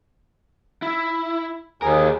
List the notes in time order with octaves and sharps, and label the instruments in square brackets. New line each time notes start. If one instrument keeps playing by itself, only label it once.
[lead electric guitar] E4
[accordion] D#2 G#4 [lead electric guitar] G4 A#4